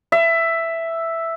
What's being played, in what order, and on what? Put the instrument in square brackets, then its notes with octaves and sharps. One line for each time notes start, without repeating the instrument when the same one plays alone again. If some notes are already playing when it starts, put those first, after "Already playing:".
[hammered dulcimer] E5